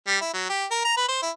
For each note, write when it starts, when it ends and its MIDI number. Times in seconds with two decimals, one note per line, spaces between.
0.07 0.21 55
0.21 0.33 64
0.34 0.44 54
0.49 0.65 67
0.71 0.85 70
0.85 0.97 82
0.97 1.08 71
1.08 1.21 72
1.22 1.31 64